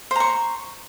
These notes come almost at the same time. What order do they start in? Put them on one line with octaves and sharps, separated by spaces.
C5 A#5 C#6